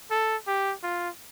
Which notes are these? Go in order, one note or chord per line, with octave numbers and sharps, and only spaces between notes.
A4
G4
F4